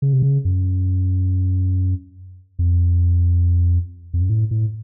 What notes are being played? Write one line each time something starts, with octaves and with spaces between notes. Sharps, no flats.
C#3
C3
C#3
F#2
F2
F2
F#2
A2
A2